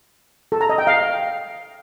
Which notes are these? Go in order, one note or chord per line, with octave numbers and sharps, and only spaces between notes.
A4
A#5
D#5
G5
F5